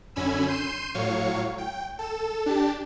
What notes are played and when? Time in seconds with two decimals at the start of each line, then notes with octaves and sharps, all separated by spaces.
0.16 F#2 D3 C#4 G#5 B5 E6
0.47 C6 G6 C7 D#7 E7
0.94 A2 F#3 C#5 F5 C#6
1.58 G5
1.99 A4 E7
2.46 D4 G4 A5